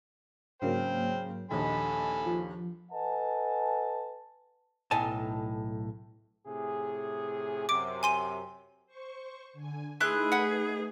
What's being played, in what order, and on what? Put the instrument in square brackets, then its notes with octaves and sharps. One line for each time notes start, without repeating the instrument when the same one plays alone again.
[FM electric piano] G#2 F#3 A#3 [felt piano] C#3 [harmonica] C5 G5
[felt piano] A#1 D#2 [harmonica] A4 G#5 B5 [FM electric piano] D#5 A5
[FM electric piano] F3
[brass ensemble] A4 B4 D#5 F#5 G#5 A5
[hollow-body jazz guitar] B1 A2 D#4 G#5 A5
[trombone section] A2 C3 G#4
[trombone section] F#2 C3 [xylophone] D6 D7
[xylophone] G#5 C6 D#7
[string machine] C5 C#6
D3 G#5
[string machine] A3 D#4 B4 [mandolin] E4 C6 F#6 [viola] G#4
[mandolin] F#5 B5